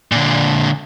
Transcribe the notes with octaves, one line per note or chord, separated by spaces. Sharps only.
A#2 D3